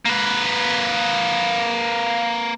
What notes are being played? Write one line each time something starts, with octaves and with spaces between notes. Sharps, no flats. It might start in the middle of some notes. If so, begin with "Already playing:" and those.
A#3 B4